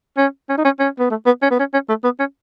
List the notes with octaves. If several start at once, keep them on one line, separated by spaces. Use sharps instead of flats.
C#4
C#4
D#4
C#4
C#4
B3
A3
B3
C#4
B3
C#4
C#4
A3
B3
C#4